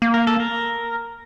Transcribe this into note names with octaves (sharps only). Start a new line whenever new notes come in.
A#3
A#4
A4
A#4